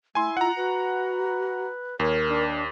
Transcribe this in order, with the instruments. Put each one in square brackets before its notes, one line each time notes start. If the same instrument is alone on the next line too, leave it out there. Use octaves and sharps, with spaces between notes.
[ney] A3 [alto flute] E4 [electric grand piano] G#5 C6
[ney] F4 [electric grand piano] F#5 A#5
[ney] F#4 [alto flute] B4
[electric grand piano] D#2 [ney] A#4 [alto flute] C#5
[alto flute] D4